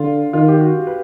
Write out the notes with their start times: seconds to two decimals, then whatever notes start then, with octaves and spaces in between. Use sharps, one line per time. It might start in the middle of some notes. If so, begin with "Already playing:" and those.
Already playing: D3 F4
0.33 D#3 F4
0.48 G4
0.60 F#4
0.87 B4